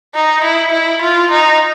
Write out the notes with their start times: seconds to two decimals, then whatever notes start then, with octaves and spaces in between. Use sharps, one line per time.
0.15 D#4
0.44 E4
0.72 E4
1.02 F4
1.31 D#4